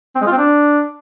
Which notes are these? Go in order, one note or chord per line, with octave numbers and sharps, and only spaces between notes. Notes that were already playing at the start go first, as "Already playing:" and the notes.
C4
G#3
F4
C4
D4